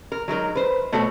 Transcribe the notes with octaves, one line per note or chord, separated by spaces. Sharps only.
A#4
F#3 G#3 D#4 A#4
B4 C5
B2 A3 F#4 A4 C5 C#5